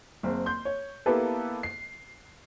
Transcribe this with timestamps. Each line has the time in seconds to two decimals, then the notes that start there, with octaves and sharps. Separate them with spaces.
0.23 F#1 C4
0.46 C6 G6
0.65 C#5
1.06 A#3 B3 E4 G4 A4 B4
1.63 C7